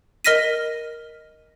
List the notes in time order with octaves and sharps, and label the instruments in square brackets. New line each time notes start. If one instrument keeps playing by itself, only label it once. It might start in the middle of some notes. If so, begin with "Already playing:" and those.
[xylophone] A#4 D#5 F6 A#6 B6 D#7